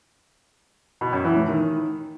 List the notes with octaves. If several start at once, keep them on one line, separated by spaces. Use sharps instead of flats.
B2
F#2
E3
A2
D#3